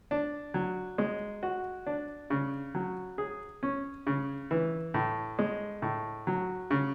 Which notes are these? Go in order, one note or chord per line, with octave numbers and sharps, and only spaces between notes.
D4
F#3
G#3
F#4
D4
C#3
F#3
G#4
C#4
C#3
E3
A2
G#3
A2
F#3
C#3